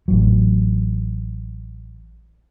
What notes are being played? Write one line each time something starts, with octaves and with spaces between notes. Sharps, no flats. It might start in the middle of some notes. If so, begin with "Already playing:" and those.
A1 F#3